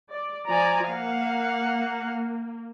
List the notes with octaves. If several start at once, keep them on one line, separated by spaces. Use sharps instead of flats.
D5
F3 D5 G#5 A#5
A#3 F5 F#5